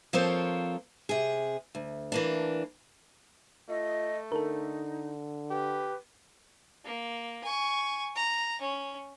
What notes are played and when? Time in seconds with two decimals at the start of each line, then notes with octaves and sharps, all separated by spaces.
0.13 F3 A#3 C4 A4 C5 C#5
1.09 C3 G#4
1.75 D2
2.12 E3 A#3 D4
3.69 A3 F4 D#5
4.32 D3 D#4 A4 A#4
5.50 G4 B4
6.85 A#3
7.44 G#5 C#6
8.15 A#5
8.61 C#4